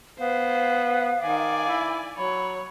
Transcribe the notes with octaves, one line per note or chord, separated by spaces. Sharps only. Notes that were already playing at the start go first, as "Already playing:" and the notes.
B3 C5 F5
D#3 D5 G#5
E4
F#3 C#5 B5